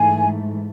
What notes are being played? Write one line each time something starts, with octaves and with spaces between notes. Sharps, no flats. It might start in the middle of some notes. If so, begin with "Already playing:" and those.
Already playing: G#2 E3 A3 G#5